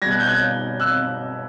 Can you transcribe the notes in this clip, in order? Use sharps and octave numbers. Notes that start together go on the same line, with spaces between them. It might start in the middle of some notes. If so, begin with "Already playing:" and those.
B2 G3 G#6 A#6
F#6
G6
F#6 G#6
E6 F#6